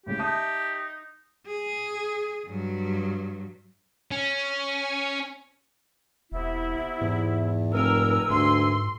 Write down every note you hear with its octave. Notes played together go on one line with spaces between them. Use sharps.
A2 C#3 G#3 G4
D#4 E5 A5 D#6
G#4
G2 F#3
C#4
E1 C3 B3 E4
E2 G#2
F1 G2 A#4 G#5 E6
D2 G#2 C6